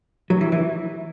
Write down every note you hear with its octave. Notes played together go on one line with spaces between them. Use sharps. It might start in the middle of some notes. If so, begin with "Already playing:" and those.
F#3
E3
E3